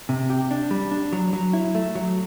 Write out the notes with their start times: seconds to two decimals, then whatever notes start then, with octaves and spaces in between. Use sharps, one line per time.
0.09 C3
0.30 G4
0.51 D4
0.71 G3
0.91 D4
1.13 F#3
1.33 F#3
1.53 E4
1.75 A3
1.95 F#3